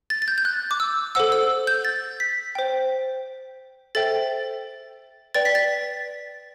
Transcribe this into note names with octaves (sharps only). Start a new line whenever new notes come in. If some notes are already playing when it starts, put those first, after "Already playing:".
A6
A6
G6
G6
F#6
D6
E6
A4 C5 F#5 E6
E6
G6
A6
B6
C5 G5
A4 C5 E5 G5 A6
B4 D5 G5 A6
B6
A6